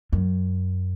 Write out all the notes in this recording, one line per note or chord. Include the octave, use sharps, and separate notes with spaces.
F#2